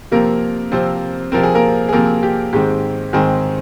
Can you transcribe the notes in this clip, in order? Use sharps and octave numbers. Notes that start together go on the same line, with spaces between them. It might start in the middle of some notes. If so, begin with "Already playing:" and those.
C3 F3 A#3 C4 A#4
C3 F3 C4 C5
C3 F3 C4 A#4
G#4
A#3 A#4
G#4
C3 F3 A#3 C4 A#4
G4
G#2 D#3 G#3 C4 G4
G#2 D#3 G#3 C4 G#4